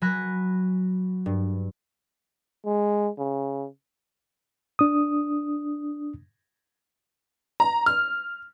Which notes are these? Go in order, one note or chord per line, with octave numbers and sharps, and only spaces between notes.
F#3 G#5 B5 F#6 A#6
G2
G#3
C#3
D4 D#6
A#5
F6